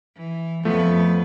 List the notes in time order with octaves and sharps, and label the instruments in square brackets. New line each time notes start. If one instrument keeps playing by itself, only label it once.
[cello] E3
[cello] F2 B3 [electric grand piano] F3 A3